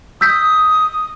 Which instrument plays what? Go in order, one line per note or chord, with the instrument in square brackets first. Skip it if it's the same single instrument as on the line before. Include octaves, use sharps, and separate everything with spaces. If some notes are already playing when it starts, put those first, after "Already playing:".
[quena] D#6 [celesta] E6 G6 B6